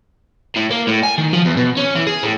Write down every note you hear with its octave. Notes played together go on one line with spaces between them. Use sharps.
A2
A#3
A2
G#5
D#3
F3
E2
B2
C#4
E3
G#4
A2